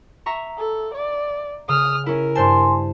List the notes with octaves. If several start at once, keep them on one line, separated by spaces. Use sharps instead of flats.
E5 A#5 C#6
A4
D5
C#3 D#6 F6
C#4 E4 A#4
G2 C5 G#5 A5 C6